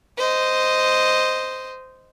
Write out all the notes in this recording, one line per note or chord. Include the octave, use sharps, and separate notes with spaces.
C5 D#5